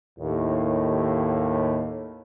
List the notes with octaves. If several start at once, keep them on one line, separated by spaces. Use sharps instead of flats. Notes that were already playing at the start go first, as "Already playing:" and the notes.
D#2 A2